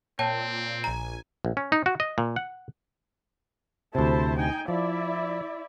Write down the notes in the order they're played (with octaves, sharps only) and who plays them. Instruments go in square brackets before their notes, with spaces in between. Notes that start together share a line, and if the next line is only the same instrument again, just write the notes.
[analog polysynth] A#2 [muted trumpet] C4 [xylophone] C#5 G5 A5
[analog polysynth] A#1 G#5 [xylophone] A#5
[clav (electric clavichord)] A#1
C#4
D#4
F#4
D#5
A#2
F#5
[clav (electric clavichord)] D2 C3 [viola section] E4 C5 A5
[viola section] D#4 G5 G#5
[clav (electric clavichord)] F3 [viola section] E4 D5 E5